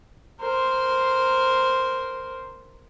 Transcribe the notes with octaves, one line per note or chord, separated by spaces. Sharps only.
A#4 C5